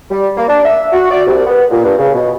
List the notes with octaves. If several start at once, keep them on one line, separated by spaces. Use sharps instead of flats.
G3
A#3
D4
E5
F#4
D5
C2
B3
A#2
G2
C#3
B2